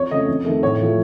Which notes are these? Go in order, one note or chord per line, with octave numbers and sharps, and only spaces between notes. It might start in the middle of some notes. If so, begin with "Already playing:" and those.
Already playing: F2 C#5
C#3 A3 D#5
F2
D#3 A3
A2 C#5
F3 A3